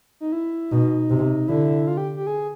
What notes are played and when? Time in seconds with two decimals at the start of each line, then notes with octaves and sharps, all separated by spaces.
0.20 D#4
0.32 E4
0.72 B2 D#4
1.10 C3
1.48 D3 E4
1.88 F4
1.97 G4
2.17 G4
2.27 G#4